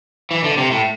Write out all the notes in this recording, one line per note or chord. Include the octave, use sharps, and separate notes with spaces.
E3
D3
C3
A2